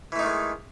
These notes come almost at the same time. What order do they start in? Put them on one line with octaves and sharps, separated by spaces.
E3 A3 D#4 D#3 G#3